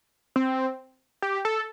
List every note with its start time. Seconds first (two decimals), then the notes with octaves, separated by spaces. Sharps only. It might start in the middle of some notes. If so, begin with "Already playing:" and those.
0.36 C4
1.22 G4
1.45 A4